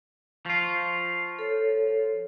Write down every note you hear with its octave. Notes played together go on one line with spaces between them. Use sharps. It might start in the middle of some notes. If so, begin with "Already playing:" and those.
F3 F4 C#6
A4 C#5